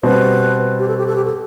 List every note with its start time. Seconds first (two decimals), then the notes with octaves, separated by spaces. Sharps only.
0.03 B2 G3 C4 F#4 B4
0.79 G4
0.88 A4
0.97 G4
1.07 A4
1.16 G4
1.25 A4